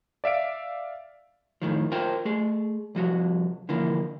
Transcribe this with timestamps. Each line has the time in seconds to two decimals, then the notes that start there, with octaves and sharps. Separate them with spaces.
0.24 D5 E5 F5 D7
1.62 F2 A2 D#3 F3
1.92 F4 A#4 C5 G5
2.25 A3 G#4
2.95 C2 F3 F#4
3.69 D3 E3 F3 A#3